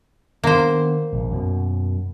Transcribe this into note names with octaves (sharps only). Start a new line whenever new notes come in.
D#3 A#3 B3 D4 C5
A#1
F#2 B2